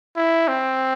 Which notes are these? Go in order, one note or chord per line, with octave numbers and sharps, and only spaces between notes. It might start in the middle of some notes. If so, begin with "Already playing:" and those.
E4
C4